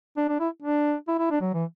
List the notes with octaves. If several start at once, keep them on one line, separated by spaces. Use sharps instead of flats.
D4
D4
E4
D4
E4
E4
D4
F#3
E3